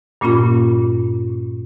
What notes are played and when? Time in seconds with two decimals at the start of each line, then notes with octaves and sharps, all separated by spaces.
0.21 G2 A#2 A#3 C#4 F4 B5